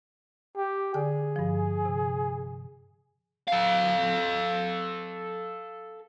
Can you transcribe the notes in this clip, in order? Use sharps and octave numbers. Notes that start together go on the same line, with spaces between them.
G4
D3 G#4 D5 G5
G2 F3
C3
A4 F5